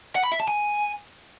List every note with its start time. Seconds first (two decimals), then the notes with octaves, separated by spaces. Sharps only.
0.15 F#5
0.24 B5
0.32 E5
0.40 A5
0.48 G#5